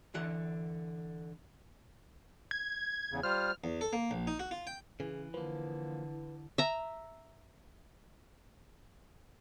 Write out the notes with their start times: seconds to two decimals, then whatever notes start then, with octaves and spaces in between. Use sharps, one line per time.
0.14 D3 E3 F#5
2.51 G#6
3.12 E2 C#3
3.23 G3 F4 C5 F6
3.64 E2
3.81 A4
3.93 A#3
4.11 A#1
4.27 D#4
4.39 F#4
4.51 F4
4.67 G5
5.00 C#3 E3 G#4
5.34 D3 F3 A#3 B4
6.58 E5 A#5